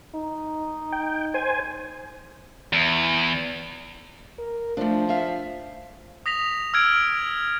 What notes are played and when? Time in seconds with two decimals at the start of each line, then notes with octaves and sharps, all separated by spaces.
0.15 D#4
0.92 G5
1.34 C5 G#5
2.73 E2
4.39 A#4
4.77 F3 A3 D4
5.09 E5 F5
6.26 D#6 A#6 B6 F7
6.74 E6 F6 G#6 D7